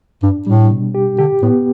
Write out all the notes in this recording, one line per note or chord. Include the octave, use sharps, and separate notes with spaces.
G2 D4
A2 G3
B2
G4
D3 G4
A2 B3